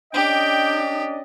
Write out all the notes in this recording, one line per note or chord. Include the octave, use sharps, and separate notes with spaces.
C#4 D4 G4 D5 D#5 G5